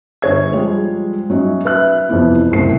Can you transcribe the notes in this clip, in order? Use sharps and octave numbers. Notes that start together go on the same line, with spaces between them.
G1 C#5 G#6
F3 G3 G#3
F#3 C#4 D#4 E5
B4 E5 F#6
F2 C3 E3 B3 E4
F#1 C2 A2 C5 C7